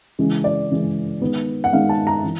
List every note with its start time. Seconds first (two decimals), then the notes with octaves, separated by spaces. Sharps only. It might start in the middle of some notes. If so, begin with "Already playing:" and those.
0.19 C#3 E3 G#3
0.44 D5
0.69 C#3 E3 G#3
1.21 D#3 G#3 B3
1.64 F#5
1.73 D#3 G#3 B3 F5
1.89 A5
2.07 A#5
2.24 E3